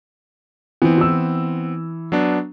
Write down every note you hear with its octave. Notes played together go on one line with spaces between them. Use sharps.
E3 B3 C4
E3 E6
F#3 B3 D4